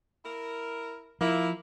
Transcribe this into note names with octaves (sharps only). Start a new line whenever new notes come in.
E4 A#4
F3 A#3 E4